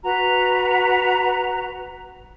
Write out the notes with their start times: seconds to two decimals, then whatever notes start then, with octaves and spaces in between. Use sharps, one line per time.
0.03 F#4 B4 A#5